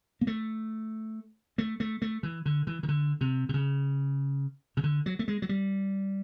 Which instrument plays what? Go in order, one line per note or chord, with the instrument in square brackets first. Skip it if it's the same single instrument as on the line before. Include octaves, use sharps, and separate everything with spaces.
[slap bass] A#3
A3
A3
A3
A3
E3
D3
E3
D#3
D3
C3
C3
C#3
C#3
D3
F#3
A3
G#3
F#3
G3